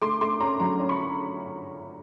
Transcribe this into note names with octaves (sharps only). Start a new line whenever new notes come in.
A3 C6 D6
A3 C6 D6
C#4 A#5 C6
F#3 A#5 C6
C#4
B5 C#6